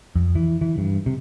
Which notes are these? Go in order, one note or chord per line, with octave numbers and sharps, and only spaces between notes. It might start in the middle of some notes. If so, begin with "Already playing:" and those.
F2
E3
E3
G2
C3